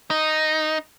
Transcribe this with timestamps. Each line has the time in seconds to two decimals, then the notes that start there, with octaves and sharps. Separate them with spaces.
0.10 D#4